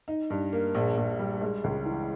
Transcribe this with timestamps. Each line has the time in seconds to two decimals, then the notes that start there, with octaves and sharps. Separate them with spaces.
0.08 D#4
0.30 G2
0.53 A#3
0.75 A#1
0.97 A#1
1.19 G3
1.41 G#3
1.64 C#2
1.86 E3